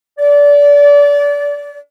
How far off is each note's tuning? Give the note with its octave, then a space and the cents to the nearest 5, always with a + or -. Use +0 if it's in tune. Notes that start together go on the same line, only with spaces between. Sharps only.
D5 -25